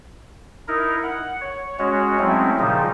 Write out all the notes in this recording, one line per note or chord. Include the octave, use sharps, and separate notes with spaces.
D#4 E4 A#4
F#5
C#5
G#3 C#4 F#4 C#5
F#3 G#3 A3 C4 C#4 E4
A#2 C#3 F3 G3 D#4